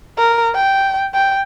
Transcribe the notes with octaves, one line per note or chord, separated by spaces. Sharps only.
A#4
G5
G5